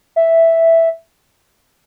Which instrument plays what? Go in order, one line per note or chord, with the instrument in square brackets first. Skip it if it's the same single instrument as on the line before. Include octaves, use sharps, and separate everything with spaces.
[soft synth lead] E5